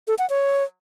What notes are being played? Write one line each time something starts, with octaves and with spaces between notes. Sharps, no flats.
A4
F#5
C#5